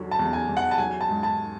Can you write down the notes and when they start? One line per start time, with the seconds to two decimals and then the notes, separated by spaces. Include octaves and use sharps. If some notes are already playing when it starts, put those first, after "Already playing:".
Already playing: E2 D3 F#3
0.11 A5
0.19 E2
0.33 G#5
0.49 E2
0.57 F#5
0.71 A5
0.78 F#3 G#5
1.01 A5
1.09 G#2
1.23 A5